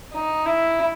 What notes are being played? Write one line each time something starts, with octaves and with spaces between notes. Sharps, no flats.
D#4
E4